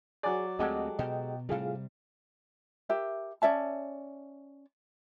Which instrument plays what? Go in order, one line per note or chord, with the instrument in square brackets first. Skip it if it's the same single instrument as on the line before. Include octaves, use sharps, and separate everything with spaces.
[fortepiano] F#3 D5 [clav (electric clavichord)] G#4
[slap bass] D2 A3 C4 [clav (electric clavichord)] G#3 G4 A4 [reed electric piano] D#5 F#5
[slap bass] B2 [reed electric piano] D#5 G5
[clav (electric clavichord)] A2 [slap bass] C3 G3 [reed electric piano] F4 G#4 F5
[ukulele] G4 A#4 E5
C#4 D5 E5 A5